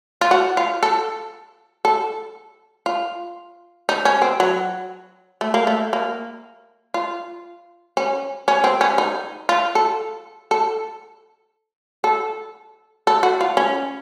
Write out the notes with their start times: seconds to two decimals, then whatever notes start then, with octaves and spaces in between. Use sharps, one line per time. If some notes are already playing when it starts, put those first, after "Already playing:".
0.21 F4
0.31 F#4
0.57 F4
0.83 A4
1.85 A4
2.86 F4
3.89 D#4
4.05 C#4
4.22 C4
4.40 F#3
5.41 A3
5.54 A#3
5.67 A3
5.93 A#3
6.94 F4
7.97 C#4
8.48 C#4
8.64 C4
8.81 C#4
8.98 D#4
9.49 F4
9.75 A4
10.51 A4
12.04 A4
13.07 A4
13.23 F#4
13.41 F4
13.57 C#4